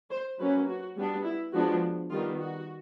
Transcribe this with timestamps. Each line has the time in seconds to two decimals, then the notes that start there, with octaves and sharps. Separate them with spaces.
0.11 C5
0.39 F#3 A#3 C#4 B4
0.68 F#4
0.97 G3 B3 D4
1.25 E4
1.53 F3 G#3 B3 D4 F#4
2.10 D#3 G3 B3 F4
2.39 F#4